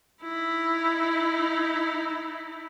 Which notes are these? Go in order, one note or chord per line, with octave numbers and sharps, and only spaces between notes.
D#4 E4